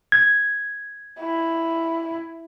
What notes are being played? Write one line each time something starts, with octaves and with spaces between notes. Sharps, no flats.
G#6
E4